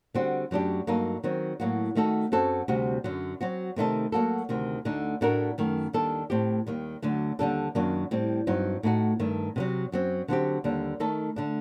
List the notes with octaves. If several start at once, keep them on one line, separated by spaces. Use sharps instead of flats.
D3 G3 C4 F#4
F#2 F#3 A3 D4 G4
G2 F#3 A#3 D#4 A4
D#3 F#3 C4
A2 F#3 A#3 F#4
D#3 A3 D#4 F#4 A4
F#2 F#3 C4 F#4 A4
D2 C3 G3 C4 F#4
F#2 D3 F#3
F#3 C4 F#4
C3 D#3 A3 D#4 A4
F#3 A#3 F#4 A4
D2 C3 D#3
D2 D3 A3 D#4
A2 A3 D4 F#4 A#4
F#2 D#3 A3
D#2 D#3 G3 D4 A4
A2 A3 C4 G4
D#2 D#3 G3
D2 D3 F#3 A3
D#2 D3 G3 D4 A4
F#2 D#3 F#3 A#3 D4
A2 G3 C4
G2 F#3 C4 D#4
A2 A3 D#4 F#4
G2 D#3 A3
C3 D#3 F#3
F#2 F#3 C4
D3 F#3 C4 G4
D#2 D3 G3 D4
D#3 A3 D#4 A4
D3 A3 D4